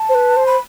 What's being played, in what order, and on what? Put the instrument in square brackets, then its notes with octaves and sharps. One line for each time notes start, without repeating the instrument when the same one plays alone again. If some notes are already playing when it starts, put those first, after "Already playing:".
Already playing: [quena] A5
[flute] C5
B4
C5
[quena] B5